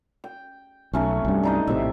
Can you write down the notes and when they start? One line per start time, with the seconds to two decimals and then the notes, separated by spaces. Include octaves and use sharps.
0.24 G5
0.93 B1 F#3 A3 C#4
1.25 C2 G2
1.43 D4 D#4 D#5
1.67 A#1 A2 C3 E5